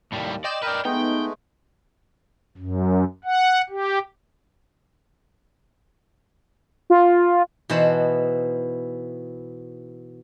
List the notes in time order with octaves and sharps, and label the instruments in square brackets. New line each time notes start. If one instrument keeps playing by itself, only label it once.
[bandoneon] D#2 [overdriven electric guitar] A2 G3
[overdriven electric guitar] D5 [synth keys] D#5 G5 E7 [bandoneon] C6
[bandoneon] A#4 G6 [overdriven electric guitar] B4 D5
[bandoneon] G#3 A3 [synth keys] B3 D#4 [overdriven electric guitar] G5
[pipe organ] F#2
F#5
G4
[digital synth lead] F4
[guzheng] B2 E3 D#4 C5 F#5 A5